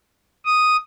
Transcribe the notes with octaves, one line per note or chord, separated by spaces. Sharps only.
D#6